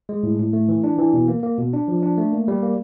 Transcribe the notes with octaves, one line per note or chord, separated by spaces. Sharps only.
G#3
A2
A2
A3
E3
D4
E3
B2
A#3
A#3
B2
D4
F3
D4
A3
A#3
G3
A#3